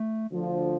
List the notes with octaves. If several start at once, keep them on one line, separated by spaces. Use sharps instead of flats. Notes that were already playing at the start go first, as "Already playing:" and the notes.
Already playing: A3
D2 D3 F3